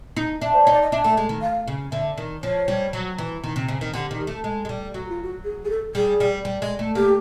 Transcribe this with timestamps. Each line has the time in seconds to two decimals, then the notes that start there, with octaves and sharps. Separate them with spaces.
0.16 D#4
0.41 D4 E5
0.53 C5
0.63 D#4 C#5
0.72 D5
0.82 D#5
0.92 D4 E5
1.04 A3
1.17 G#3
1.29 D#3
1.42 F5
1.67 C#3
1.92 D3 E5
2.18 D#3
2.43 F3 C#5
2.68 G3
2.93 F#3
3.18 E3
3.44 D#3
3.56 C3
3.68 C#3
3.81 D#3
3.93 D3 G4
4.11 D#3
4.27 A3
4.44 G#3
4.65 G#3
4.69 G3
4.94 F#3 F#4
5.09 F4
5.23 F#4
5.44 G#4
5.65 G#4
5.70 A4
5.95 G3 G#4
6.20 G3
6.45 G3
6.62 G#3
6.79 A3
6.95 A#3 G4